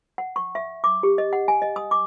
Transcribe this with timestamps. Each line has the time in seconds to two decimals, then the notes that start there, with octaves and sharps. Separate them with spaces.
0.18 F#5
0.36 C#6
0.55 E5
0.84 D6
1.03 G4
1.18 D#5
1.33 F#5
1.48 G#5
1.62 D#5
1.76 D#6
1.91 D6